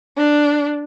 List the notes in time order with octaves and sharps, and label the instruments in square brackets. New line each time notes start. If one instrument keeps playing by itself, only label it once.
[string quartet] D4